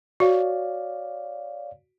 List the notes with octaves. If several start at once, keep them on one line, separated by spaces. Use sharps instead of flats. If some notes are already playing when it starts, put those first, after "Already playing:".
F#4 C#5 D5 F5